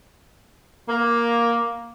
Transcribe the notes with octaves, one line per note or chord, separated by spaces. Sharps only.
A#3